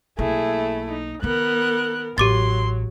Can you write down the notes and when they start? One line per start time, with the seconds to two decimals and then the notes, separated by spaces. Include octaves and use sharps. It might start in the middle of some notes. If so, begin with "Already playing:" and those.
0.19 B1 A3 A#3 E4 G#4
0.89 D#4
1.23 D#3 B3 D#4 A#4 F#6
2.18 A1 F#3 G4 C6 D6 A6